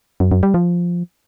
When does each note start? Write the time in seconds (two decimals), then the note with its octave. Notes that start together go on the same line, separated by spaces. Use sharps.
0.20 F#2
0.32 F#2
0.43 G3
0.54 F3